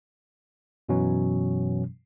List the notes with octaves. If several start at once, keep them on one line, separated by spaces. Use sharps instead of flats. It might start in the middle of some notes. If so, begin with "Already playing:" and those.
F#2 B2 E3 F#3 C#4